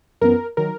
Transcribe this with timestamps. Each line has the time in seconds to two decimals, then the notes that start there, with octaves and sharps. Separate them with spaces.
0.21 F#2 E3 B3 A#4
0.57 D#3 F#3 A#4